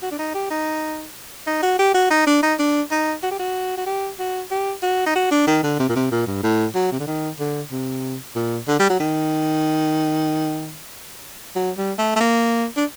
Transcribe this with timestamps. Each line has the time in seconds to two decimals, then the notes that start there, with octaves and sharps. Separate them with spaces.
0.02 F#4
0.11 D4
0.19 D#4
0.34 G4
0.50 D#4
1.47 D#4
1.63 F#4
1.79 G4
1.94 F#4
2.11 D#4
2.27 D4
2.42 D#4
2.59 D4
2.91 D#4
3.23 F#4
3.31 G4
3.39 F#4
3.77 F#4
3.87 G4
4.19 F#4
4.51 G4
4.83 F#4
5.06 D#4
5.15 F#4
5.31 D4
5.47 D#3
5.63 D3
5.79 C3
5.89 A#2
5.96 C3
6.11 A#2
6.27 G2
6.43 A2
6.75 F#3
6.92 C3
7.00 D3
7.07 D#3
7.39 D3
7.71 C3
8.36 A#2
8.68 D3
8.80 G3
8.90 F#3
9.00 D#3
11.56 F#3
11.78 G3
11.99 A3
12.16 A3
12.20 A#3
12.77 D4